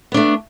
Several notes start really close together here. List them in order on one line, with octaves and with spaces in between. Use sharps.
B3 D4 A3